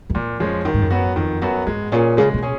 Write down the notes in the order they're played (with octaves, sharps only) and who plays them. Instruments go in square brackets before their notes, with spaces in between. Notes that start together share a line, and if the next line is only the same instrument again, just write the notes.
[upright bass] F#2
[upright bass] F2 [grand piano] A#2
[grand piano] F3 G#3 C#4
[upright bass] F#2 [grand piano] D#3
[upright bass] G#2
F#2
[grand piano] F#3 B3 F#4
[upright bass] F2 [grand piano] D#3
[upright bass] F#2 [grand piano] F#3 B3 F#4
[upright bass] G#2 [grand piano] G#3
[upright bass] A#2 [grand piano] C#4 G#4
[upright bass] C#3 [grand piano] G#3
[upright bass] B2
[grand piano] C#4 G#4